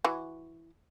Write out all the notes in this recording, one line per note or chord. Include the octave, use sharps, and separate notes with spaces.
E3 F#4